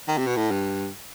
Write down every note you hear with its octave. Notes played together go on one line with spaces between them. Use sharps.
D#3
C3
B2
A2
G2